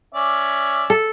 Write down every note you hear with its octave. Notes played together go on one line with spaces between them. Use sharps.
C#4 D5 E5
A4